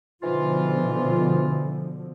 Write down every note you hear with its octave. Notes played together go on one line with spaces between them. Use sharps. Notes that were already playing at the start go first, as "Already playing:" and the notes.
G#2 B2 D3 E3 F3 F4